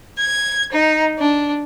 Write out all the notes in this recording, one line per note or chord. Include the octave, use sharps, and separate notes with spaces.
G#6
D#4
D4